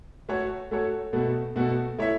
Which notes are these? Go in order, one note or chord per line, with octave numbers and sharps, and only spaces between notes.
A3 F#4 A4 C#5
A3 F#4 A4 C#5
B2 A3 F#4 A4
B2 A3 F#4 A4
A3 E4 C#5 E5